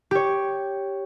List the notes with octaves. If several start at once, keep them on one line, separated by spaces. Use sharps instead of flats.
G4 C#5